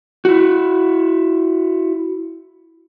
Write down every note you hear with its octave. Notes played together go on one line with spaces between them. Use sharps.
E4 F#4